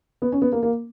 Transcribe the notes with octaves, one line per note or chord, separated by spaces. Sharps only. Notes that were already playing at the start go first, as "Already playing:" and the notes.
B3
C#4
B3
A#3
A#3